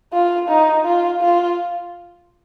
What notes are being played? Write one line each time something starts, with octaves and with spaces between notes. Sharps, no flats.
F4
D#4
F4
F4